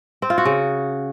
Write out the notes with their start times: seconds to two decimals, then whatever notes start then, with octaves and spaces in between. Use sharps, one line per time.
0.22 C4
0.30 F4
0.38 F#4
0.45 C#3